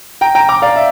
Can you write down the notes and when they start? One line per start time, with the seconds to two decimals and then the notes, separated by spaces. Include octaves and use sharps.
0.21 G5 A#5
0.35 G5 A#5
0.49 A#5 D6
0.62 D5 F5
0.76 E5